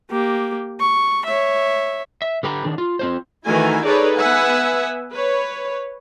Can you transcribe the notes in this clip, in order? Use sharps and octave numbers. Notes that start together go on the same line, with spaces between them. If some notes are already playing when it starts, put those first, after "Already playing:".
A#3 G4
C#6
C#5 E5
E5
D3 G4 B4 G5 A5 A#5
D#3 D4 G#4
F4
C4 F4 C5
D#3 E3 A3 E4 F#4 G#5
D#4 G#4 A4 B4 C#5 D5
B3 B4 E5 F#5 G#5
B4 C#5